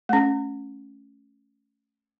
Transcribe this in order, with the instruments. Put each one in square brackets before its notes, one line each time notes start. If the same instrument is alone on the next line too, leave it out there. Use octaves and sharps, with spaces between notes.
[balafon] A3 C#4